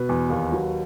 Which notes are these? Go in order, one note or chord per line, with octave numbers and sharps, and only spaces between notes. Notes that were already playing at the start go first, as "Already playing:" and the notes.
Already playing: B2 B4
E2
D#2
F#3